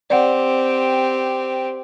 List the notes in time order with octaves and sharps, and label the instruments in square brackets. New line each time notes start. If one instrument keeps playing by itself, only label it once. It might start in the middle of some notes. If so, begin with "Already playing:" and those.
[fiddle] C4 G4 [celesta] D5 F#5